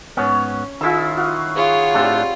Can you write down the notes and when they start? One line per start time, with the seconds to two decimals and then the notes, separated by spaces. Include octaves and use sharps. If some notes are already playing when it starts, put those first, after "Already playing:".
0.17 G#2 B3 C#4 C#5
0.81 D#3 E4 F4 G#4 E6
1.17 F#4 F5
1.56 F4 G#4 C#5
1.94 A2 G3 A3 C4 D4